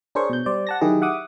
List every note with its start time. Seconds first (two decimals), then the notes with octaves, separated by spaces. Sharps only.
0.15 D4 G#4 A#4 C5 C#5 C#6
0.30 B2 G6
0.46 G3 C5 D5
0.67 F#5 A5 A#6
0.81 D#3 F#3 E4 G4 G#4
1.01 E5 F#5 D6 D#6